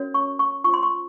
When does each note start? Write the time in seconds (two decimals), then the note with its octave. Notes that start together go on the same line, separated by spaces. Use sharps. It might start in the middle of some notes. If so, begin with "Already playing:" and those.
Already playing: C#4 F#4 A#4 C#5
0.14 C#6
0.39 C#6
0.64 F4 C5 C#6
0.74 C6
0.83 C#6